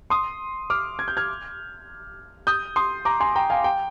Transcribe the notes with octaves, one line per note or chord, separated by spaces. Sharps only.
C6 D#6
D6 F6
G#6
G6
F6 G#6
D#6 G6
C6 D#6
A#5 D6
G#5 C6
G5 A#5
F5 G#5
G5